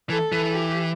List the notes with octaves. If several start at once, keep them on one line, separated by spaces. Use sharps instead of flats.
E3 A4
E3
G4